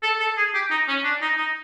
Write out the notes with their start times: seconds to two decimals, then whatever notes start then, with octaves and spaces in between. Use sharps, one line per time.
0.03 A4
0.20 A4
0.37 G#4
0.54 G4
0.70 D#4
0.88 C#4
1.04 D4
1.21 D#4
1.38 D#4